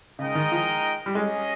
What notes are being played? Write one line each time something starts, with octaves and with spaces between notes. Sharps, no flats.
C#3 G#3 D#4 A#4 D#5 G5
D#3
F3
G3
G#3 C#4 G#4 D#5